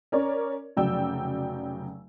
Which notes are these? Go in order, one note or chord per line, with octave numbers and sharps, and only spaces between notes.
C#4 A#4 C#5 D5
F1 C#3 F#3 D5 G5 E6